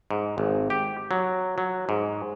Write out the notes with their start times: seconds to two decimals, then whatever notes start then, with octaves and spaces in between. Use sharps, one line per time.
0.11 G#2
0.38 G#1
0.70 G4
1.11 F#3
1.58 F#3
1.89 G#2